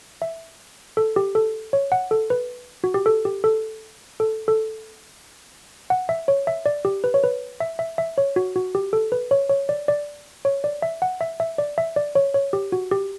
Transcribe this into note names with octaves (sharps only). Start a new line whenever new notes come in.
E5
A4
G4
A4
C#5
F#5
A4
B4
F#4
G4
A4
G4
A4
A4
A4
F#5
E5
C#5
E5
D5
G4
B4
C#5
B4
E5
E5
E5
C#5
F#4
F#4
G4
A4
B4
C#5
C#5
D5
D5
C#5
D5
E5
F#5
E5
E5
D5
E5
D5
C#5
C#5
G4
F#4
G4